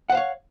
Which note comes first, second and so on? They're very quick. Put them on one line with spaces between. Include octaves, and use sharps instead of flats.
F#5 C5 F5 C#5